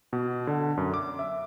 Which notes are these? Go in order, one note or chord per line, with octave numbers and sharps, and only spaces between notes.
B2
D3
F#2
D6
E5